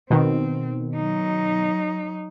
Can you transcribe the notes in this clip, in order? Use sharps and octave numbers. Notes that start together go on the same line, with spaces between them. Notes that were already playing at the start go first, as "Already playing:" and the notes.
B2 D#3 C4
F#3 D#4